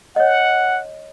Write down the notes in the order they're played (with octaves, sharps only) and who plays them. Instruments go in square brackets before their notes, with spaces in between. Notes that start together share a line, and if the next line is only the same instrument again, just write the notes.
[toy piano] C#5 D#5 [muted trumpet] F#5